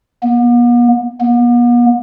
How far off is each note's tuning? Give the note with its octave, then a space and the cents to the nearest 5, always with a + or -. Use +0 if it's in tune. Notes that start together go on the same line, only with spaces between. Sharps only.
B3 -45
B3 -45